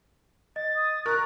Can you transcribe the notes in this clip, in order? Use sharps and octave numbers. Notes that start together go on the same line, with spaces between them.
D#5 A6
D#6
A#4 C#6 F#6